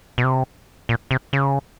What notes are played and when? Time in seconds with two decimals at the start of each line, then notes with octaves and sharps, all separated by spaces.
0.18 B2
0.24 C3
0.89 A#2
1.11 C3
1.33 C#3